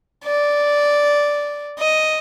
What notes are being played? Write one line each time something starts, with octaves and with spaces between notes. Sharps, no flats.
D5
D#5